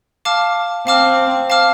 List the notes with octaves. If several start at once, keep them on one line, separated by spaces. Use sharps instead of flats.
F5 A5 D6 F6
C4 F5 A5 D6 F6
F5 A5 D6 F6